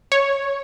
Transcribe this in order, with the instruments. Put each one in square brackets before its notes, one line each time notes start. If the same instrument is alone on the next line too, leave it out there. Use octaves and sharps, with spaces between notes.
[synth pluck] C#5